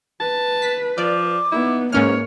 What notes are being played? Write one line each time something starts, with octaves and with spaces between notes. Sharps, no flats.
B4 A5
B6
F3 D5 D6
B3 D#4 E4
G#2 E3 A#3 C#4 C#5 F6